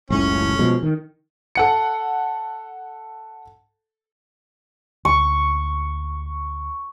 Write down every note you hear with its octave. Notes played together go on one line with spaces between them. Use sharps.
F#1 C#2 A2 C#4
B2 F3 G#3
D#3
A4 F#5 C#7
D2 C#6